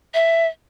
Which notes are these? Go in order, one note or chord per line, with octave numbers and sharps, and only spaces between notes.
E5